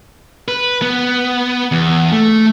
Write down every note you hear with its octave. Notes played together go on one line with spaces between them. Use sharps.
B4
B3
E2
A3